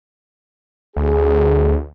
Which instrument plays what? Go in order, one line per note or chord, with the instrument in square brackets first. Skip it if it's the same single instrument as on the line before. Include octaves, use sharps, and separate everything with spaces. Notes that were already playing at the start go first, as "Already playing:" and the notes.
[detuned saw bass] D2 [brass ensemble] G#4